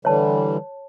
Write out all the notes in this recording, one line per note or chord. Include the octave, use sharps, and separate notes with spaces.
D3 E3 G3 C#5 A5